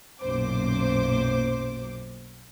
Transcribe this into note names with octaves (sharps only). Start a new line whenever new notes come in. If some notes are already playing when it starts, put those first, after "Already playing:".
B1 F#2 A#2 C5 D6